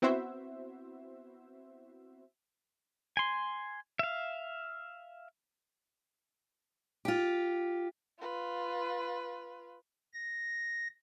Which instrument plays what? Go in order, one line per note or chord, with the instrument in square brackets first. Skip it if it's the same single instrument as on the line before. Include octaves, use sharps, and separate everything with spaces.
[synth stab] B3 C4 E4 F#4 C5 E5
[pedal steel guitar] G#5 C6
E5 F5
[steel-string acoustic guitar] F4 G4
[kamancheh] F4 B4
[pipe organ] A#6